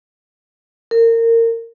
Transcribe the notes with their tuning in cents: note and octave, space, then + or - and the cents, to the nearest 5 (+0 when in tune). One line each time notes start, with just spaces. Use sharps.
A#4 -25